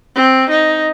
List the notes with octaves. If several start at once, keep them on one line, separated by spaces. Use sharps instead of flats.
C4
D#4